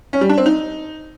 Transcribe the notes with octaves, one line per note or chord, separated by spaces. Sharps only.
C#4
G3
D4
C4
D#4